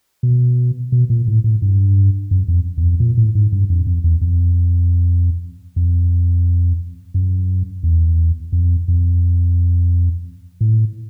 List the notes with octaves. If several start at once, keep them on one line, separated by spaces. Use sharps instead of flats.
B2
B2
A#2
A2
A2
G2
F#2
F2
E2
F2
A#2
A2
G#2
G2
F2
F2
E2
F2
F2
F#2
E2
F2
F2
A2